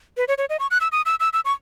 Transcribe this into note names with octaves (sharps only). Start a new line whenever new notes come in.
B4
C#5
C#5
D#5
C#6
F#6
E6
D#6
E6
E6
E6
C#6